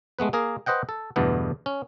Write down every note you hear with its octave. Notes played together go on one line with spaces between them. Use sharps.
G#3 A3 B3 B4
A#3 G#4 A#4
B4 C5 D#5 F#5 G5
A4
E2 G2 B2 D3 A3 B3
C#4